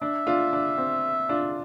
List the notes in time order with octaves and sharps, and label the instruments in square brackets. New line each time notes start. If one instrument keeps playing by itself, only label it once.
[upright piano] D4 [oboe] E5
[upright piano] D4 F4
D4
C4
D4 F4